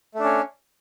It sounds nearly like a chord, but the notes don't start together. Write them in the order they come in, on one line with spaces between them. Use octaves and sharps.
A3 D4 C#4